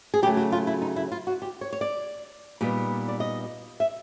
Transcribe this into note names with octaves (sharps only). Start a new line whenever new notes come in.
G#4
C#3 F#3 A3 G4
F#4
F4
E4
D#4
E4
F4
F#4
G4
C#5
C#5
D5
A#2 G3 B3 D#4
D5
D#5
E5